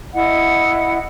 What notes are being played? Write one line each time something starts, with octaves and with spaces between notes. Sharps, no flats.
E4 D#5 F#5